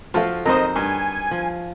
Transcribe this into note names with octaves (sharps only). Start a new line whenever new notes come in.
F3 F4 F#4 A4
F2 D#4 A#4 C5 D#5
G2 G#5
F3